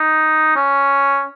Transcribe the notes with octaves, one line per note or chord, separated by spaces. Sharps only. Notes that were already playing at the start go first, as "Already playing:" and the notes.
Already playing: D#4
C#4